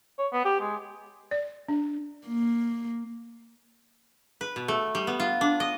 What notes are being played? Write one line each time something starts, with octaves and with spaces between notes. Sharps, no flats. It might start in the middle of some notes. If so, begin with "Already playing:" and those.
C#5
B3
G4
G#3
D5
D4
A#3
B4
B2
A3
G3
B3
F4
D4
D#5